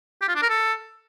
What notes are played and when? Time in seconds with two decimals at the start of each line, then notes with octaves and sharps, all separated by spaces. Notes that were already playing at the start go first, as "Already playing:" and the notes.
0.22 G4
0.29 F4
0.35 D4
0.42 A#4
0.49 A4